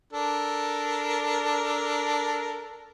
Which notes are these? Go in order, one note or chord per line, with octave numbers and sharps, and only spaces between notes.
D4 A4 A#4